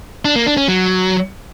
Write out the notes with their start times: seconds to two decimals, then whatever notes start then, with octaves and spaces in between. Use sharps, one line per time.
0.25 D4
0.36 A#3
0.46 D4
0.57 C#4
0.68 F#3